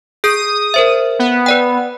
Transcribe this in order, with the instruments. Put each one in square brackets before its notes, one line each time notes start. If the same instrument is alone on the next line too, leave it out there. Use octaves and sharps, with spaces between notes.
[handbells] G#4 G6 C7 [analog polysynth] D#6
[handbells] A#4 C5 E5
[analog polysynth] B3
[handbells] B4 D5 G5